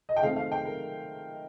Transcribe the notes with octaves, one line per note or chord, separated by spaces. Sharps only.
D#5
G5
D#3 A3 C4 F5
F5
G5
A#4